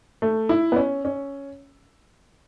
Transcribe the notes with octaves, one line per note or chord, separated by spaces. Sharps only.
A3
E4
B3
C#4
C#4